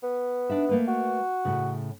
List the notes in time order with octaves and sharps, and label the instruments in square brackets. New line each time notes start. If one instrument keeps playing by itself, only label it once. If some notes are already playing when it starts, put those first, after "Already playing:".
[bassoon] B3
[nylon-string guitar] D4 D#4 E5
A3 A#3 B4
[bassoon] F#4
[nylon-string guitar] A2 C#3